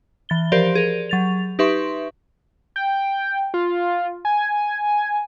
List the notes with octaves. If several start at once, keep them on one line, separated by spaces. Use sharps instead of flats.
E3 A6 G7
F3 G4 A#4 C5 D5
G#4 A#4
F#3 A6 F7
D#4 G4 B4 E5 C6 C#6
G5
F4
G#5